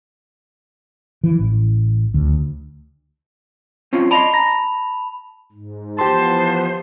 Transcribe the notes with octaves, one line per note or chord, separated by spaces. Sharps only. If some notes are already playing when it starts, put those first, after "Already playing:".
E3
A1
D2
C4 C#4 F4
D5 D#5 A5 B5 C6 F7
A#5
G#2
E3 F3 B3 G4 C5 A5 C6